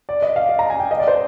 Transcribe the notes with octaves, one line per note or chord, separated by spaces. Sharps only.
D5
D#5
F5
D#5
A#5
G#5
G5
D#5
D5
C5